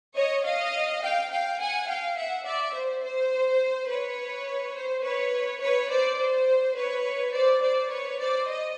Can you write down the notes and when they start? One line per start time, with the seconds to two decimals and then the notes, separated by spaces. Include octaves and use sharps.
0.16 C#5 D#5
0.45 D#5 F5
1.03 F5 G5
1.31 F5 G5
1.60 F#5 G#5
1.88 F5 G5
2.17 E5 F#5
2.46 D5 E5
2.75 C5
3.03 C5
3.89 B4 C#5
4.75 C5
5.04 B4 C#5
5.61 B4 C#5
5.90 C5 D5
6.19 C5
6.76 B4 C#5
7.33 C5 D5
7.62 C5 D5
7.91 B4 C#5
8.20 C5 D5
8.48 D#5